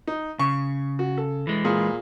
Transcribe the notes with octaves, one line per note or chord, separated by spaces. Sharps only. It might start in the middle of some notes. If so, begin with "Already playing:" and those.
D#4
C#3 C#6
F#4
A4
E3 G#3
A#2 G#4